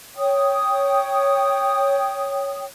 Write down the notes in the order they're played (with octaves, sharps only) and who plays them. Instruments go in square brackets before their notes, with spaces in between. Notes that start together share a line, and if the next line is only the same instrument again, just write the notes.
[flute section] C#5 G5 D#6